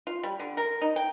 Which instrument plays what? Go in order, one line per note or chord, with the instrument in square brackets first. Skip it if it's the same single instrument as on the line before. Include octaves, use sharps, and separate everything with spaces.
[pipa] F4
G3
D3
A#4
D#4
G5